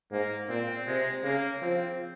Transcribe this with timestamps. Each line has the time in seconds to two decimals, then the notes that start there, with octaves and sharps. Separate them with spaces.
0.11 G#2 A#3
0.49 A#2 C4
0.87 C3 G#3
1.24 C#3 A#3
1.62 F3 C4